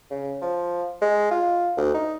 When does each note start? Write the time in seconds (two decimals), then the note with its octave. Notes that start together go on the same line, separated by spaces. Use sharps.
0.11 C#3
0.42 F3
1.02 G#3
1.31 F4
1.77 D2
1.94 D#4